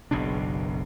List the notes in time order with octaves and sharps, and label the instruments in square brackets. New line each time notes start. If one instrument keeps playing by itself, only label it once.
[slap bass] F#1 B1 B2 D4